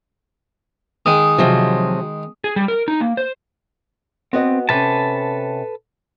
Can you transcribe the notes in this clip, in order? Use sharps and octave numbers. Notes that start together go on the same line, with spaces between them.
D#3 G#3 D#6
C3 F3 F#3
G#4
G3
A#4
D#4
A#3
C5
B3 C4 F#4 D#5
C3 C#4 A4 B4 A5